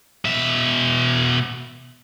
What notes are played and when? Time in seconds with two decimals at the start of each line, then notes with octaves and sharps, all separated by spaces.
0.25 B2 E5